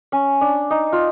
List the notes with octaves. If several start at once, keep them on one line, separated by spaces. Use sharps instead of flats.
C#4
D4
D#4
F4